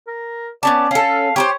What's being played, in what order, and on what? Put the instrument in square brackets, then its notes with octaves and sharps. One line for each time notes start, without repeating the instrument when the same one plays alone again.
[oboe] A#4
[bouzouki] B3 C#4 A5 [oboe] D5
[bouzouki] C#4 A4 [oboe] F5
[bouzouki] G4 A#4 C5 [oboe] C#5